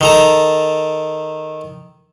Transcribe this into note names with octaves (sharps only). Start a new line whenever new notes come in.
D#3 A4 A#5